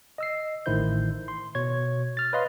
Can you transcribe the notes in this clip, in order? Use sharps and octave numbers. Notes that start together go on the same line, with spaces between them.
D#5 E6 C7
A1 A2 D#3 E4 C5 G6
C6
B2 C#5 G#6
F6 A6
B4 C#5 D#5 F5 C6